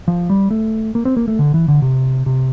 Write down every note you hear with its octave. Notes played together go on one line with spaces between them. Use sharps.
F3
G3
A3
A#3
C4
A#3
A3
D3
E3
D3
C3
C3